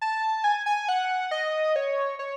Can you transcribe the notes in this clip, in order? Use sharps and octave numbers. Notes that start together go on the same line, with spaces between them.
A5
G#5
G#5
F#5
D#5
C#5
C#5